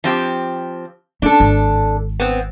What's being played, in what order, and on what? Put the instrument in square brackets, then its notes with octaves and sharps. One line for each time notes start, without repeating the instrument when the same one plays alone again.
[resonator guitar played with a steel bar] F3 C4 G4
[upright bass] C#4 E4 [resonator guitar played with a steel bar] D4 A4
[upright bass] G#1
[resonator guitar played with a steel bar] B3 C4